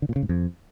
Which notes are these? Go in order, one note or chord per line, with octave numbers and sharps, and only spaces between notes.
D3
A#2
C#3
G#2
F2